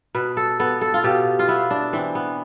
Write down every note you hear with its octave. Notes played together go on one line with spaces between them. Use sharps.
B2 B4
A4
B3 A4
A4
F4
B2 G4
F4
B3 E4
D4
E3 C4
B3